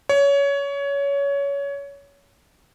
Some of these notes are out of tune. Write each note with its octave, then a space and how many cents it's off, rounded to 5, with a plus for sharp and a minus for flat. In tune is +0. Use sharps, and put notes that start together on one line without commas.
C#5 +20